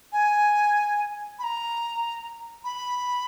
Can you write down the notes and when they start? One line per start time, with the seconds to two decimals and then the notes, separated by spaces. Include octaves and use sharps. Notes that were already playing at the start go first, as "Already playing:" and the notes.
0.13 G#5
1.39 B5
1.44 A#5
2.64 B5